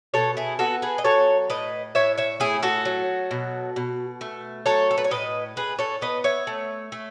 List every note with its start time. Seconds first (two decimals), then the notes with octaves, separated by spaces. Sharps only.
0.14 B2 A4 C#5
0.37 E4 G#4
0.59 B3 F#4 A4
0.82 G#4 B4
0.98 D#5
1.04 F#3 A4 C#5
1.50 A2 B4 D#5
1.95 A2 C#5 E5
2.18 C#5 E5
2.40 A3 E4 G#4
2.63 F#4 A4
2.85 F#3
3.31 B2
3.76 B2
4.21 A3
4.66 F#3 A4 C#5
4.91 A4
4.98 B4
5.04 C#5
5.11 A2 B4 D#5
5.56 A2 G#4 B4
5.79 A4 C#5
6.01 B3 B4 D#5
6.24 C#5 E5
6.47 A3
6.92 A3